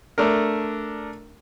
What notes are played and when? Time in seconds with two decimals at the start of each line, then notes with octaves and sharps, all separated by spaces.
0.18 A3 D4 A#4